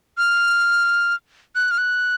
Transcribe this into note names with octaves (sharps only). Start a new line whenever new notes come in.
F6
F#6
F6
F#6